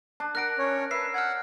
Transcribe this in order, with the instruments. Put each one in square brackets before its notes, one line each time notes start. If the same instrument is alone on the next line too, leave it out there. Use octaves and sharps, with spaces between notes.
[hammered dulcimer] D4 [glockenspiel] A5
[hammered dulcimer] A#4 F#5 [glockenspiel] F#6 A#6 D7
[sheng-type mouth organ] C#4 C#5
[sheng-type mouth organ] B4 [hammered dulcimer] E5 [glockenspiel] C7
[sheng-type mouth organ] F#5 [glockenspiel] F6 G#6